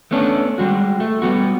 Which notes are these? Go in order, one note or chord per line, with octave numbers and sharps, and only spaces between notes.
A3 B3 C#4 D4
G3 G#3 F#4
A3
G3 B3 F#4